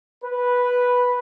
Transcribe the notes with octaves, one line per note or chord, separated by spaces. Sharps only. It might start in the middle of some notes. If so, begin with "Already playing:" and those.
B4